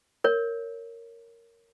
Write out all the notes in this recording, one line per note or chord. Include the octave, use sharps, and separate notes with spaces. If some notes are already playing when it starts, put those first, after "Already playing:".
A#4 C#5